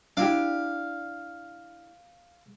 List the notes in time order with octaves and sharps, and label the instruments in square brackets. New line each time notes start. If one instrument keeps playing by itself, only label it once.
[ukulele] D4 E4 G4 [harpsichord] F5